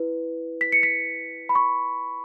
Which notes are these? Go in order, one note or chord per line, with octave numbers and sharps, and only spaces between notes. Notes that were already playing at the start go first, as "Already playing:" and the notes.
Already playing: E4 B4
B6
C#7
B6
B5
C#6